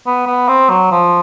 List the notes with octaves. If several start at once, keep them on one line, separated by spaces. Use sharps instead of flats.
B3
B3
C4
F#3
F3